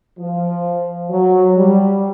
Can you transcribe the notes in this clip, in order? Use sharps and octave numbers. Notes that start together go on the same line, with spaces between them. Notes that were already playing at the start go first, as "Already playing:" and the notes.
F3
F#3
G3